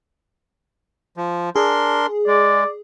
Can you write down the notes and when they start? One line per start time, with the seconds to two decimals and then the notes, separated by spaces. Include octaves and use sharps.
1.17 F3
1.56 D4 G#4 A#4 C6
2.27 G#3 D5